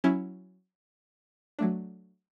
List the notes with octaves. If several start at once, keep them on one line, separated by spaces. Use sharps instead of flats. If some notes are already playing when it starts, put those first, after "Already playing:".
F#3 C#4 E4
F#3 A3 D4